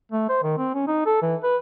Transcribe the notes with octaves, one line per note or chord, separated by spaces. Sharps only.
A3
C5
D#3
C4
C#4
D#4
A4
E3
B4